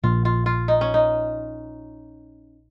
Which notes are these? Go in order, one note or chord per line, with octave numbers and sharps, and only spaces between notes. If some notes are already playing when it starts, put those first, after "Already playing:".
A#1 A#2 F3 A#3 F4
F4
F4
D#4
C#4
D#4